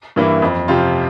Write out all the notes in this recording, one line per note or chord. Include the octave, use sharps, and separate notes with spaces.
G2 E3 A#3 E4
F2
C3 F3 C4 F4